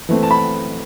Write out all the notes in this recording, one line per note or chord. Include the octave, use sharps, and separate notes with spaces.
E3 A3 C4
A5
B5